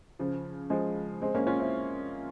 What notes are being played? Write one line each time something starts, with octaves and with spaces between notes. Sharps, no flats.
C#3 F3
F3 G#3
G#3 C4
A#3 C#4
C#4 F4
C4 E4